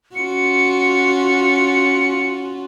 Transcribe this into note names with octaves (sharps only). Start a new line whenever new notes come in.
C#4 F4 F#4 C#7